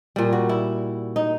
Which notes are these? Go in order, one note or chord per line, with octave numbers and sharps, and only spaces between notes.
A#2 G3
F#4
E4
D#4